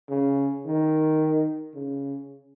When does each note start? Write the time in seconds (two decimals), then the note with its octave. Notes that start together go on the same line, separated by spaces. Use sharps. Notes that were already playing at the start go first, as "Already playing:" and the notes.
0.10 C#3
0.65 D#3
1.75 C#3